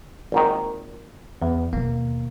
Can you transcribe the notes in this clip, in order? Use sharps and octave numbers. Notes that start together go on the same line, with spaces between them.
G#1 A#2 D#3
E2
D#2 B2 A#3